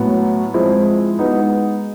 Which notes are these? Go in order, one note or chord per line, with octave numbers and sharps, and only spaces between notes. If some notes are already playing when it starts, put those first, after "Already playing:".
Already playing: A2 F#3 B3
F3 G#3 C4 E4
G#3 B3 D#4 F#4 B4